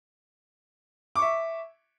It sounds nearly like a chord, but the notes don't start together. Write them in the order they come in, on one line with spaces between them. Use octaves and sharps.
D6 C#6 E5